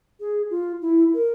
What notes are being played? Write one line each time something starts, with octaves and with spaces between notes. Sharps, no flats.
G#4
F4
E4
A#4